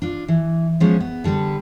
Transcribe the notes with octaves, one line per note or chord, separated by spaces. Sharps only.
D4 F4
E3
F3 G#3 B3 C#4
B3
D3 G3 A4 B4